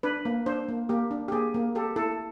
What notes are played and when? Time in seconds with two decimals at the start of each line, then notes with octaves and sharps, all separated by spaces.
0.03 D4 B4
0.25 A#3
0.46 D4 C5
0.68 A#3
0.89 A#3 G4
1.11 D4
1.28 G4
1.32 A#3 G#4
1.54 A#3
1.75 G4 A4
1.96 E4 A4